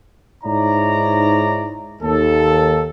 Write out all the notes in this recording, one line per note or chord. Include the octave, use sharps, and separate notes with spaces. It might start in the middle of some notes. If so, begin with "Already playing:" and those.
G#2 D#4 E4 C#5 D5 A#5
D#2 A4